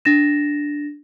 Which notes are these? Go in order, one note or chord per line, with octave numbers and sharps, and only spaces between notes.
D4 A6 A#6 E7